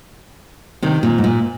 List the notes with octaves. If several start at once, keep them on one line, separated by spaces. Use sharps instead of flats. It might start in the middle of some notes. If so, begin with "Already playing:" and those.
C3 D#3
A#2
G#2
A#2